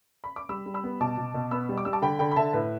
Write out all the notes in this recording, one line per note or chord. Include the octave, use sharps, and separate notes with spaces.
B5
D6
G3 B5 E6
G3
B5 E6
B3
B2 A5 D6
B2
B2
B3 B5 E6
G3
D6
G3 E6
A5 D6
D3 G5 B5
D3 G5 B5
B5
D3 E5 A5
A2 B4 E5